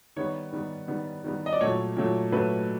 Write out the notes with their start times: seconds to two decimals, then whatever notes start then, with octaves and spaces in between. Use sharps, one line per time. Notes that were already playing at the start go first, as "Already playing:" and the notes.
0.16 D#3 G3 B3 C#5
0.52 D#3 G3 B3
0.88 D#3 G3 B3
1.24 D#3 G3 B3
1.46 D#5
1.53 D5
1.61 A#2 F#3 A3 C#5
1.97 A#2 F#3 A3
2.32 A#2 F#3 A3 B4